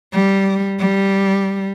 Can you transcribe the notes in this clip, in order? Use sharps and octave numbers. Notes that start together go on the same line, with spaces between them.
G3
G3